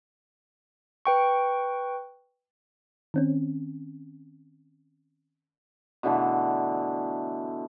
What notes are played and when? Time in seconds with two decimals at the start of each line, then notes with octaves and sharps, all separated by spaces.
1.05 B4 G5 C#6
3.14 D#3 C4 C#4
6.03 B2 D3 E3 A3